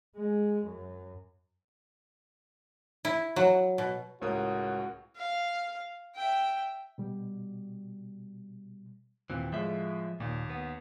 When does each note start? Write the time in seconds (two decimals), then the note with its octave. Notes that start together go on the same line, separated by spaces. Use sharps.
0.16 G#3
0.64 F#2
3.05 E4
3.36 F#3
3.78 B2
4.21 C#2 A2 F#4 A#4 C#5 D#6
5.16 F5
6.16 E5 G5
6.98 B2 G3
9.30 D#2 A#2 E3 C4
9.53 A2 F3 G#3 E5
10.20 D#2 A#2
10.50 B3